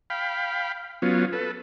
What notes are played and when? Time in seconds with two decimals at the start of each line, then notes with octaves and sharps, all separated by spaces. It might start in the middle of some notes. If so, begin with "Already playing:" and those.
0.10 F5 G5 B5
1.02 F#3 B3 C#4 F4
1.33 A4 B4